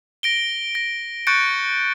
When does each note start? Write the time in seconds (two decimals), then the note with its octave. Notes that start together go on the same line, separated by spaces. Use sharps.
0.23 A#6 D7 G7
0.75 A#6
1.27 C#6 F#6 G6 A6 C#7 D7